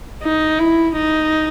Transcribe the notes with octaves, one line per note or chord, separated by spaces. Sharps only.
D#4
E4
D#4